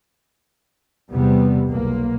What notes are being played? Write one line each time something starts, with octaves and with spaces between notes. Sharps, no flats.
E2 C3 G3 B3
B1 A#3